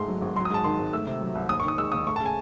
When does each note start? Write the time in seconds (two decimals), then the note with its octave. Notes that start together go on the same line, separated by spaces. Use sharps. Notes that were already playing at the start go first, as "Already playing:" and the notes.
Already playing: G#2 A3 C6
0.08 F#3
0.22 G#1
0.36 F#3 C6
0.45 D#6
0.50 G#2 A5
0.64 D#3 C6
0.79 G#1
0.93 A3 E6
1.07 C3
1.21 F#3
1.35 C2
1.49 D#2 D#6
1.60 C#6
1.64 D#3 D#6
1.78 G#3 E6
1.92 D#2 D#6
2.07 A3 C#6
2.16 A5
2.20 C#3
2.26 G#5